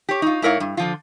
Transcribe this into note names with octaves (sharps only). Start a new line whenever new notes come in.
G4 C#5
D#4 F4
G#2 E4 A#4 C#5 F5
G2
D3 F3 F4